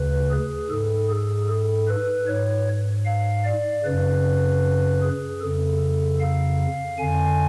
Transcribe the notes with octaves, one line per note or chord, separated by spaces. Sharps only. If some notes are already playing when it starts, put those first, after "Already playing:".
Already playing: D2 C#3 B4
G#4
G#2 A4
G#4
A4
B4
G#2 C#5
F5
D5
F#2 C#3 B4
G#4
F2 C#3 A4
F5
F2 D3 G#5